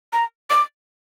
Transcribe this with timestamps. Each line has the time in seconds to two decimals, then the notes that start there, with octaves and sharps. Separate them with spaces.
0.13 A#5
0.50 D6